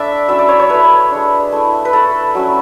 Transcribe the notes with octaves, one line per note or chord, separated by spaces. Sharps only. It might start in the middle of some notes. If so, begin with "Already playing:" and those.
Already playing: A3 D4 E4 D5 E5
F#3 C#4 E4 E5
D5
C#5
C#5
A3 E4 B4
G#3 D4
A3 E4
B4
A3 E4 A4
F#3 C#4 E4